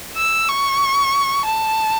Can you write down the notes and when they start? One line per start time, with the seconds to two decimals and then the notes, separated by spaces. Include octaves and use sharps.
0.17 E6
0.48 C#6
1.45 A5